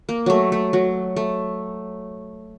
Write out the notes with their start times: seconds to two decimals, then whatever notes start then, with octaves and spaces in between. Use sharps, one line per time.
0.09 A#3
0.26 F#3 A3
0.52 A3
0.73 F#3
1.16 A3